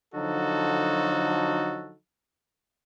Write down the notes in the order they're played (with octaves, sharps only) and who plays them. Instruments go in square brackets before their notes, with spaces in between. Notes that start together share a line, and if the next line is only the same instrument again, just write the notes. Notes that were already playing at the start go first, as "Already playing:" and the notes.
[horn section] D3 F3 F#3 D#4 F#4 A4